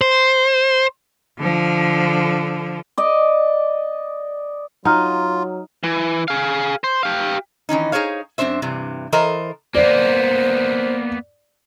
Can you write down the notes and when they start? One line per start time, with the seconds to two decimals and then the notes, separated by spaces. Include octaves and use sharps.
0.01 C5
1.38 D3 F3
2.98 D5 D#5
4.85 F#3 D#4 F4 F#5 A#5 F6
5.84 E3
6.28 G#4 F5
6.84 C5
7.03 G4 F5
7.69 D#3 E3 C#4 D#4
7.92 D#4 G#4 C5 C#5 F5
8.38 F#2 C4 D4 C5 E5
8.62 G2 C3 E3
9.12 E3 A4 A#4 C5 D#5
9.75 A#3 B3 C5 D5